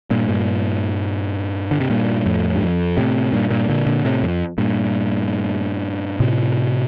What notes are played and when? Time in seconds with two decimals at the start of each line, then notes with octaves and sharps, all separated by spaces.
0.10 G2 A#2
0.29 G2 A#2
1.71 D3
1.80 C3
1.90 G2 A#2
2.26 F2 A2
2.55 G2
2.62 F2
2.97 A2 C3
3.33 G2 A#2
3.50 G2 A#2
3.70 A#2 D3
3.86 A#2 D3
4.05 A2 C3
4.23 F2
4.58 G2 A#2
6.20 A2 C3